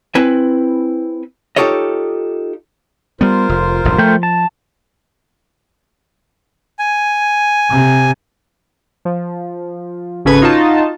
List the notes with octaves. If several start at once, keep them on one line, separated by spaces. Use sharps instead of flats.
C4 E4 B4 G#5
D#4 F4 G4 A4 C#5 D#5
G3 B3 F4 A#4 C5
F1
D#1 A#1 G2
F3 A3 G5
A5
G#5
C3
F3
G#1 C#3 C#4 A4 B4 G#6
D#4 F4 F#4 A5